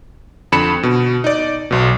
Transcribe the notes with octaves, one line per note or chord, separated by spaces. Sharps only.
F2 D3 B5 C#7 E7
B2
D#4 D5
B1 B2